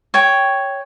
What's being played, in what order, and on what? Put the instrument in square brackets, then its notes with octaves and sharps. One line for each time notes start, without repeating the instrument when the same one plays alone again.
[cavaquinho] C#5 G5